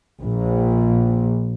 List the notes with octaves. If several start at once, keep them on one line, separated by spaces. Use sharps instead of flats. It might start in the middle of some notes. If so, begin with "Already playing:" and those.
A#1